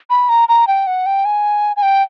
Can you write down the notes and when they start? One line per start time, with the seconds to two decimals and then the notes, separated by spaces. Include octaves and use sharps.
0.10 B5
0.29 A#5
0.49 A#5
0.67 G5
0.87 F#5
1.06 G5
1.25 G#5
1.77 G#5
1.83 G5